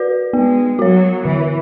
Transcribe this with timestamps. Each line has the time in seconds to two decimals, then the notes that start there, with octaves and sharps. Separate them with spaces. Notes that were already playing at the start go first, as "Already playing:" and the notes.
Already playing: F#4 B4 D5
0.33 G#3 B3
0.79 F#3 F#4 C#5
1.24 D3 E3